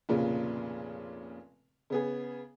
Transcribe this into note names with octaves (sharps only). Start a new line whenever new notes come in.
F1 A#2 C#3 F4
C#3 B3 G#4